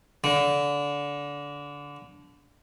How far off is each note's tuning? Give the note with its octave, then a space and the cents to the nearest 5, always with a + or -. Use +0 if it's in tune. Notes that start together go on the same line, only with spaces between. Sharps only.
D3 -25